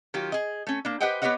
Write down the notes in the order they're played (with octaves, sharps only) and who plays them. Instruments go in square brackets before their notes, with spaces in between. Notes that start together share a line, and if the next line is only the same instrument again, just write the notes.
[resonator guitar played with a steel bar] D#3 F#3 F4 G4
G#4 D#5
A3 C#4
A#3 D4
G4 B4 C5 D#5 F#5 G5
B3 G4 B4 C#5 D#5 F#5